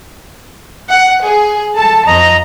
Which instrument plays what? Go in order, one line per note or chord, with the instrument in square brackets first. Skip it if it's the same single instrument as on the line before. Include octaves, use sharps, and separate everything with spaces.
[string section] F#5
G#4
[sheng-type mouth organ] A4 [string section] A5
[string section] F2 [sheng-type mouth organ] D#5 A#5